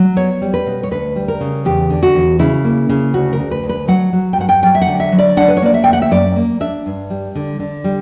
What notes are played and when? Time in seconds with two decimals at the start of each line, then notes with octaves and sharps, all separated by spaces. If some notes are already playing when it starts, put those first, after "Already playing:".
Already playing: F#3
0.16 B3 C#5
0.42 G3
0.54 B4
0.66 B2
0.83 C#5
0.91 D2 B4
1.16 G3
1.28 A#4
1.41 C#3
1.65 E2 G4
1.90 D3
2.03 F#4
2.15 E2
2.39 C#3 E4
2.64 A#3
2.89 C#3
3.14 D2 F#4
3.33 A#4
3.39 D2
3.51 B4
3.64 D2
3.69 B4
3.88 F#3 F#5
4.13 F#3
4.33 G5
4.38 G2 F#5
4.49 G5
4.62 F#3 G5
4.75 E5
4.82 F#5
4.87 D3
5.00 E5
5.12 F#3
5.18 D5
5.37 D4 F#5
5.48 B4
5.57 C#5
5.62 A#3 D5
5.74 E5
5.84 D2 G5
5.93 F#5
6.02 E5
6.11 F#2 D5
6.36 A#3
6.60 D4 E5
6.86 G2
7.10 G3
7.35 D3
7.60 D3
7.84 G3